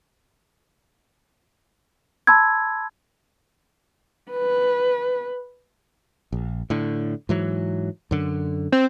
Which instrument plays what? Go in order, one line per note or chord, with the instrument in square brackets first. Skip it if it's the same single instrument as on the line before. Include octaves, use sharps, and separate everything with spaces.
[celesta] A5 B5 C6 E6 G#6
[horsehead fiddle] B4
[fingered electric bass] A#1
A2 D3
G#2 E3 F#3
F#2 D3
[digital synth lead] C4